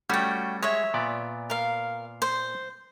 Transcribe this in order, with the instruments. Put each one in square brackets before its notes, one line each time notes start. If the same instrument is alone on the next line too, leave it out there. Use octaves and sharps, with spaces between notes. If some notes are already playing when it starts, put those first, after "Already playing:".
[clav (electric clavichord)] G3 A3 C#4 [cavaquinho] F#4 G5
[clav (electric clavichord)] G#3 [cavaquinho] C#5 E5
[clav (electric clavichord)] A#2 B3 D5
[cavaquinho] A#4 F5
C5